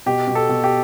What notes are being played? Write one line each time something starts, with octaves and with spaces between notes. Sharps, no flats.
B2 G4
B2
A4
B2
G4